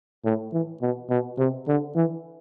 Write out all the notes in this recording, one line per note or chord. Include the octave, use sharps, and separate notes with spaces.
A2
E3
B2
B2
C3
D3
E3